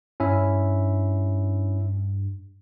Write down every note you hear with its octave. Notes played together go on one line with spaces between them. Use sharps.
G2 C#4 E4 E5